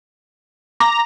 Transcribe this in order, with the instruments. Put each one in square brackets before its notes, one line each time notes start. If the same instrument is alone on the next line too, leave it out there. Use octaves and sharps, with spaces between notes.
[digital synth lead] A#5 [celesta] D6